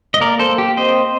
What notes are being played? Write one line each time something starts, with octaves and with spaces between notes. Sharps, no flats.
D#5
A#3 A#4 D5
A4 C5
A#3
G4
C4 C5 D#5